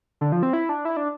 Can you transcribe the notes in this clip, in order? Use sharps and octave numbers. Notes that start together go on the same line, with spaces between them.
D3
F3
C4
E4
D4
E4
D4